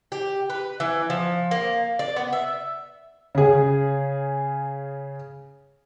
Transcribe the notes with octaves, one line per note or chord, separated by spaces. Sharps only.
G4
B4
E3
F3
A#3
D5
B3
E5
C#3 G#4